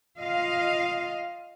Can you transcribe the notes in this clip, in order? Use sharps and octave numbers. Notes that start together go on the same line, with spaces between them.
F4 D#5 F5